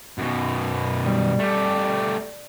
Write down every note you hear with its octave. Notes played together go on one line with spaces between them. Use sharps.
F#2 B2
G3
A3 G4